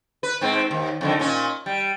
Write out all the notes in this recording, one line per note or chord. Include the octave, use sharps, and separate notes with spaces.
B4
G#2 C4
D#2
F2 D3 D#3
A#2 C#4
G3